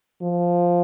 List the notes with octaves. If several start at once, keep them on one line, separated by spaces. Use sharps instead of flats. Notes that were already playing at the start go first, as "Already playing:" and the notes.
F3